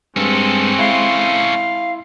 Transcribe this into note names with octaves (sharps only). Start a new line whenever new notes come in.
G2 G#3 C4 C#4 A4
E4 F5 C6